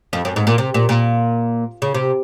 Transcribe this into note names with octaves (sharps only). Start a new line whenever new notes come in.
F2
F#2
G#2
A#2
C3
A#2
A#2
C#3
C3